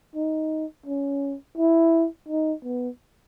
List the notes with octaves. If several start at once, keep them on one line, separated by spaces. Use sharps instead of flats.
D#4
C#4
E4
D#4
B3